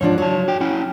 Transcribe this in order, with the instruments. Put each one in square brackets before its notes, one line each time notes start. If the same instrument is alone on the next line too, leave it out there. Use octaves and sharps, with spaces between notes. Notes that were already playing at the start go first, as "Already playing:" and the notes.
[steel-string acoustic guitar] G#2 F3 D4 [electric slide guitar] C#5
[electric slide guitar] F#3 A5 [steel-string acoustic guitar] C#5
[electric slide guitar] F#4 G5
C#4 E4 G5